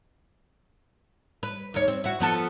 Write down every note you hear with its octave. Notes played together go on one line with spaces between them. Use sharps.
B4
D#2 C#5
C4
E4 F#4
F3 B3 A4